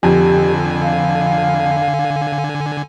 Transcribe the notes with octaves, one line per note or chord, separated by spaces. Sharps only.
F2 D3 G4 G#5
F5